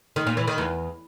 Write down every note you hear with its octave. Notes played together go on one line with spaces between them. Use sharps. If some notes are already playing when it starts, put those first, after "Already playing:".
D#3
A#2
E3
D#3
E2